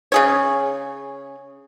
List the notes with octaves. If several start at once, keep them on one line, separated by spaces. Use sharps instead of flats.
C#3 G#4 C#5